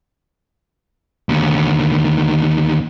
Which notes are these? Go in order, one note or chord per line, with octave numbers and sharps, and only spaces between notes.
D#2 D3